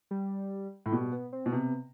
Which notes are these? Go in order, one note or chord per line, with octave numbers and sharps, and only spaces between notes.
G3
A2
B2 G3
B3
C4
B2
C3 B3